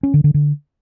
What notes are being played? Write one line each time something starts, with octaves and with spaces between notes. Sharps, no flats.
C#4
D3
D3
D3